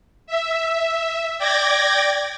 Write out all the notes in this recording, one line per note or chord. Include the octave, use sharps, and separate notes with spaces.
E5
D5 G5 D6 G#6 A#6